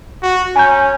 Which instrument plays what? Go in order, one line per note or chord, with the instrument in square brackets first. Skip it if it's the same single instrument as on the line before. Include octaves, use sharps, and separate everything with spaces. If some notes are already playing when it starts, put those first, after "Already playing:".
[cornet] F#4
[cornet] C#4 [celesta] G#5 A#5 G6